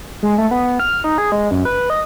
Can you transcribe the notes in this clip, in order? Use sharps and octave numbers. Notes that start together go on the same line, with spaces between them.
G#3
A3
B3
F6
D#4
G#4
G#3
F#2
B4
D#5